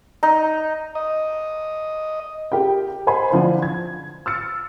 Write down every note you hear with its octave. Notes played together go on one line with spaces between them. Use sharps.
D#4
D#5
G4 A#4 G5
A#4 C5 D#5 G#5 B5 C6
D3 F3 E4 C5
G#6
E6 F6 A6 C#7